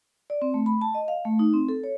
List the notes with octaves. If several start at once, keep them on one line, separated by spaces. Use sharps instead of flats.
D5
C4
A3
B5
A5
D#5
F5
A3
D#4
C4
A4
C#5